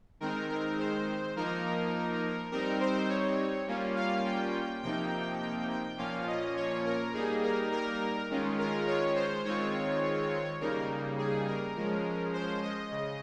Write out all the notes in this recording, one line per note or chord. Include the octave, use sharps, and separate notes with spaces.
D#3 G#3 C4 D#4 A#4
A#4
C5
F3 A#3 D#4 A#4
G3 C4 D#4 A#4
C5
C#5
G3 A#3 C#4 F4
F5
G5
C3 F3 A#3 D#4 G5
G5
G5
A#2 F3 A#3 C#4 F4 F5
D#5
C#5
A#4
G3 A#3 D#4 G#4
A#4
A#4
D#3 G#3 C#4 F4
A#4
C#5
C5
D#3 G#3 C4 F4 C#5
C#3 G3 A#3 D#4 A#4
G#4
A#4
F3 G#3 C#4
C5
D#5
C#3